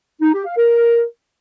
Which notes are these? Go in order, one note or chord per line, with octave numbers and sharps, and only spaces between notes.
D#4
G4
F5
A#4